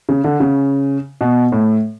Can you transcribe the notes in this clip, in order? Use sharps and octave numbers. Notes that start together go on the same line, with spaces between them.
C#3
D3
C#3
B2
A2